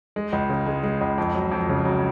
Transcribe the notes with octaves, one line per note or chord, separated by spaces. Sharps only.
G#3
C#2
C#3
G#3
G#3
C#2
F2
F#3
F2
C#3
F#3